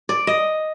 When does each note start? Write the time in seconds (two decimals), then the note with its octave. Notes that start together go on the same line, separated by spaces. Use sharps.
0.09 D5
0.27 D#5